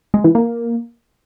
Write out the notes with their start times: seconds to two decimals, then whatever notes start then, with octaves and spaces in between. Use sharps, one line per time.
0.14 G#3
0.24 E3
0.35 A#3